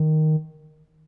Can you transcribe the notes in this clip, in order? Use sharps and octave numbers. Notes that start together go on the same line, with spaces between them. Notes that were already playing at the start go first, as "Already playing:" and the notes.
Already playing: D#3